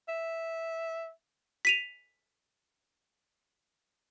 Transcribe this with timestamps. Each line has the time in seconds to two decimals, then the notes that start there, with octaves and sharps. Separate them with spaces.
0.08 E5
1.65 B6 D#7 F7